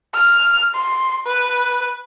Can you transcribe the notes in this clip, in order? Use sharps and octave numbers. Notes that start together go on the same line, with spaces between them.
F6
C6
B4